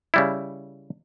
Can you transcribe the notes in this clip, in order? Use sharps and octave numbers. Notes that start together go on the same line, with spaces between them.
C#3 G3 E4